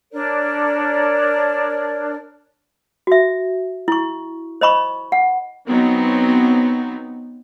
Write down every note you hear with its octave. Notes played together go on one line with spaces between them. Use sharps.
D4 A#4 C#5 D5
F#4 E5
E4 C#6
C5 D#5 B5 C#6
F#5
F#3 B3 C4 D#4